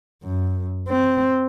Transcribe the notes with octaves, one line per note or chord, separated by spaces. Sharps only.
F#2
C4